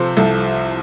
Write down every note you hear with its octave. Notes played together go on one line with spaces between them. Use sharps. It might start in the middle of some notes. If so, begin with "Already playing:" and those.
Already playing: C3 F3 A4 C5
C2 A4